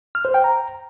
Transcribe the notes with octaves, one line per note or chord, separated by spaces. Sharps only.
F6
C5
G5
A#5